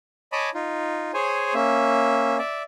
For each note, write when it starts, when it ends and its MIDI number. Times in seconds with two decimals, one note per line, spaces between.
0.32 0.50 73
0.32 0.50 75
0.32 0.50 80
0.32 0.50 81
0.32 0.50 83
0.32 0.50 86
0.54 1.11 63
0.54 1.11 65
1.14 1.54 68
1.14 1.54 72
1.14 1.54 73
1.14 1.54 80
1.54 2.38 58
1.54 2.38 61
1.54 2.38 76
2.39 2.63 74
2.39 2.63 76